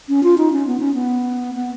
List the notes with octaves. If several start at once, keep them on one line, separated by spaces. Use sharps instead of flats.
C#4
F4
D#4
C#4
B3
C#4
B3
B3